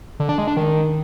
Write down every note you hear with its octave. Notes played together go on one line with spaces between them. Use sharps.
D3
D4
G#3
D4
D#3